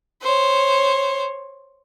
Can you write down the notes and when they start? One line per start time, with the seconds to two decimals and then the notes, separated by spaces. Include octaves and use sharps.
0.22 C5 C#5